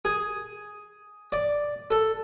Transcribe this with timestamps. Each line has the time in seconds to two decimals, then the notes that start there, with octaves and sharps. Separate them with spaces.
0.05 G#4
1.32 D5
1.91 A4